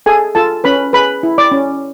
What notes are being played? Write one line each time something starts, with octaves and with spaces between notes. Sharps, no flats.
G#4 A4 G#5
F4 A4 A5
C#4 B4 B5
G#4 B4 B5
E4
D5 D6
C#4